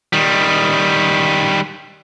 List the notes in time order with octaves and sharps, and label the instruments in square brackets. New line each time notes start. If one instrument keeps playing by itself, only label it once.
[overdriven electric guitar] D#3 G3